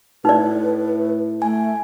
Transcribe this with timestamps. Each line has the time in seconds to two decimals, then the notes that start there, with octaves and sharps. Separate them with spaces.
0.25 A2 D#4 B4 D5
1.42 A3 G#5